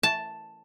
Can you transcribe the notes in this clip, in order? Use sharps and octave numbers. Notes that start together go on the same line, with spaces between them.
A5